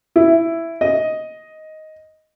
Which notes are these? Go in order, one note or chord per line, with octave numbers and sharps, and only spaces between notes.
E4
D#5